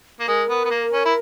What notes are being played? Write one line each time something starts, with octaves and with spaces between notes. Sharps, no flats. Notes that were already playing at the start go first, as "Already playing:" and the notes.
A#3
G#3 A#4
B3
B3
A#3
C#4
E4